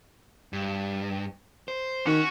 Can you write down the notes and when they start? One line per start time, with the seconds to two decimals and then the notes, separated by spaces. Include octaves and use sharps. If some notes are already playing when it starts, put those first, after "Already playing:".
0.53 G2
1.68 C5
2.07 D#3 C#4 F#4